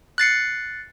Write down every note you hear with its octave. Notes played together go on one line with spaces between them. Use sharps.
F#6 A6 C7 C#7